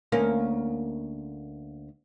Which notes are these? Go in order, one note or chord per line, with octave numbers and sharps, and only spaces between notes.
D2 A#3 C#4